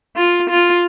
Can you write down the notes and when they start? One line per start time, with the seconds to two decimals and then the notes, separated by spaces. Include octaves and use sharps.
0.16 F4
0.50 F4